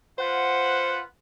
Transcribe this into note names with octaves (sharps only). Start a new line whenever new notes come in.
F4 B4 C5 F#5